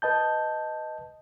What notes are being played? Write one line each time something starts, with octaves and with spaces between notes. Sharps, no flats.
B4 D#5 A5 G6